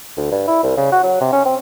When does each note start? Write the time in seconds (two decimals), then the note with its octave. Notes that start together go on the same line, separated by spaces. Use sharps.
0.17 D2
0.31 G2
0.48 E4
0.63 C2
0.77 C#3
0.92 F#4
1.03 F#3
1.21 C3
1.33 C#4
1.46 C4